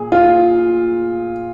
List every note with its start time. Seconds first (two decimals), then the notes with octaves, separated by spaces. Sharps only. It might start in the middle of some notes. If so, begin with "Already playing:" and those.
Already playing: A#2 G#4
0.12 F4